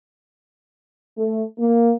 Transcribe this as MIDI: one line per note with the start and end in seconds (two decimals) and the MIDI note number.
1.16 1.42 57
1.58 1.92 58